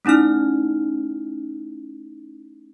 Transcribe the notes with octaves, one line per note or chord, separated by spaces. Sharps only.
A3 C#4 D#4 E4 F6